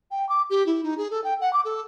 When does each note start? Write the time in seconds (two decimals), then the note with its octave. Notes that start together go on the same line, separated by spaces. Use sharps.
0.11 G5
0.29 D6
0.50 G4
0.66 E4
0.83 D#4
0.98 G#4
1.11 A4
1.24 G5
1.41 F#5
1.53 D6
1.65 A4